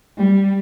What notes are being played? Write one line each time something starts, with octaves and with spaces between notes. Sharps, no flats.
G3